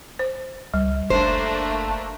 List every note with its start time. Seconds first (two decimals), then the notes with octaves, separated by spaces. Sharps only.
0.19 C5
0.74 C#2 G3
1.10 F#1 A3 A#3 D4 C5